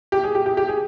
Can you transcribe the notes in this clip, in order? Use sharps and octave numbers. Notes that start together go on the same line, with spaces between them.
G4
G#4
G4
G4
G4
G#4